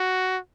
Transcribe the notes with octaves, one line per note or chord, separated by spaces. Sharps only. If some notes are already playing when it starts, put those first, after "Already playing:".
Already playing: F#4